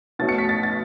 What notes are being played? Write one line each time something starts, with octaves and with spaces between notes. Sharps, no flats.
B2 A3 C#4 A6
C#7
B6
A6
A6